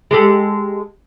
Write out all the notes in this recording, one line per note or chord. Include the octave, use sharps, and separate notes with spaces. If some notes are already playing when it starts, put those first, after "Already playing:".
G#3 G4 A4